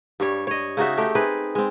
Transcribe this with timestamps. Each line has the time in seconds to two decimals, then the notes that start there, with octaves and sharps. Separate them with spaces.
0.20 G2 G3 C#5
0.47 C#5 D#5
0.77 C#3 D#4 F#4 E5
0.97 A3 D#4 G4
1.15 C4 D#4 G#4 B4
1.55 G#3 C4